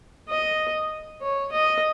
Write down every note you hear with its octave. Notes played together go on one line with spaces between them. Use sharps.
D#5
C#5
D#5